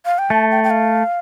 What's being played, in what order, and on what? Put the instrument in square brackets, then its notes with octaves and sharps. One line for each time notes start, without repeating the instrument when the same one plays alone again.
[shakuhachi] F5
G5
[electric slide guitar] A3 [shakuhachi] A5
[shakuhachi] G5
G5
F5